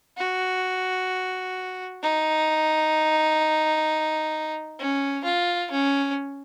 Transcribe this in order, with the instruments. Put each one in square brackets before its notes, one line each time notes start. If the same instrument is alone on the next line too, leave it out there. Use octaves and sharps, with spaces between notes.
[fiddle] F#4
D#4
C#4
F4
C#4